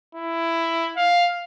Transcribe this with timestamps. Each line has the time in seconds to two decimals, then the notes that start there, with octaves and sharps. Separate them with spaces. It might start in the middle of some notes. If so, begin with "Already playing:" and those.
0.15 E4
0.96 F5